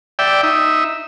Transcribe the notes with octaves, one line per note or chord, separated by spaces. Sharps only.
D5 E5 G5
D#4 E5